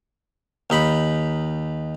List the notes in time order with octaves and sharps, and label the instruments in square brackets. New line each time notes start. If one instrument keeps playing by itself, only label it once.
[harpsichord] D#2 D#4 B5